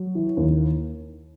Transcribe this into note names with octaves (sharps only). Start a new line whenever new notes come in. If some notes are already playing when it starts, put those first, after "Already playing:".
Already playing: F#3
E3
D#2